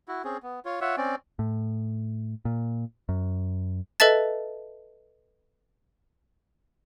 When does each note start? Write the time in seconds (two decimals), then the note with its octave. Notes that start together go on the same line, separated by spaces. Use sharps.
0.08 E4 F#4
0.25 C4 C#4 G#4
0.43 B3
0.65 F4 C#5
0.81 F4 C#5 E5 F#5
0.97 C4 C#4 D5
1.39 A2
2.45 A#2
3.09 F#2
4.00 A4 B4 D#5 E5 A5 A6